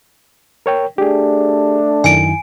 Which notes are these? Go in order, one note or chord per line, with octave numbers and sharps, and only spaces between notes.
A#4 C#5 G5
A3 D4 G4 G#4
F#2 D#3 E4 G#5 D7